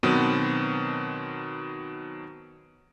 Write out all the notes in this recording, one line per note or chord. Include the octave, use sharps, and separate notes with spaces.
B2 D#3 F#3 B3 C4